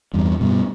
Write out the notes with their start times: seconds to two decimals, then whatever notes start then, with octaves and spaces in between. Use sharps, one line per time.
0.13 E2 G2
0.40 G2 B2